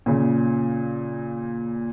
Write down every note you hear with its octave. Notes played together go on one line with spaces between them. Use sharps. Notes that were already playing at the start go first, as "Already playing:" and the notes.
A#2 C#3